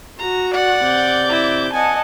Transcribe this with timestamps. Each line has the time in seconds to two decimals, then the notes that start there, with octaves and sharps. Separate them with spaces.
0.19 F#4 A#5
0.53 D5 F#5
0.85 C3 D6 G6
1.29 E4
1.73 D#5 F#5 G#5 A5